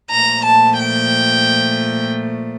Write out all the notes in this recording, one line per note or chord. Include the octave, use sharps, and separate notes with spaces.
A#2 F3 A3 A#5
A5
G5